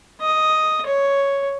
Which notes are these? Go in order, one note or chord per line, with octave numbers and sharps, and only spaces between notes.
D#5
C#5